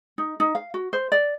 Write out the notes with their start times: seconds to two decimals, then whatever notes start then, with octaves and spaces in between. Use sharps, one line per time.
0.18 D#4
0.40 D#4
0.55 F5
0.74 F#4
0.93 C5
1.12 D5